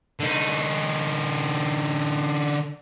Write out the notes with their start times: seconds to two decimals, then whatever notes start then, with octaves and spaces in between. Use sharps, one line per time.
0.20 D3 D#4